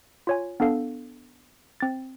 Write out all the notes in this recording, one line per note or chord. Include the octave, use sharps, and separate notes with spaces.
F4 C#5 G#5
B3 D4 A4 F5
C4 A6